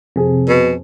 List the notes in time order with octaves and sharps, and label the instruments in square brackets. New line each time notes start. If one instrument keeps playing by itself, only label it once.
[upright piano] F2 G#4 [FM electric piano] C3
[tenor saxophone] B2